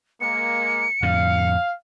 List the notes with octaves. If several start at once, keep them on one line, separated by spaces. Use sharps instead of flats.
G#3 A#3 C#7
F2 A2 D3 F5